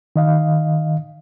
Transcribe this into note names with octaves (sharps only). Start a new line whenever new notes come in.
D#3 D#5 F5